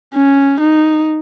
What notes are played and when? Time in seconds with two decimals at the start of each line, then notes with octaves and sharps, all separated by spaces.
0.14 C#4
0.61 D#4